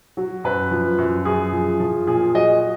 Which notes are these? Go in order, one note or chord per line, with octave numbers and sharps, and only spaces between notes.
F#3
F#2 B4
F3
F#2
F#2 G#4
F3
F3
A#2 G#4
F#3 D#5